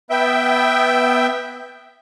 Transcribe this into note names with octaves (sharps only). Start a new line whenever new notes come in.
B3 E5 G5